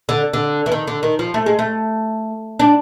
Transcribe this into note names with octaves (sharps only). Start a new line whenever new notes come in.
D3
D3
E3
D#3
D3
D#3
F3
A3
G#3
A3
D4